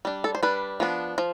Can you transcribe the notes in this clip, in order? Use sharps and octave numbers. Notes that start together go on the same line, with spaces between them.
G3 D4
A4
C5
G3 D4 B4
F3 B3 D4
F3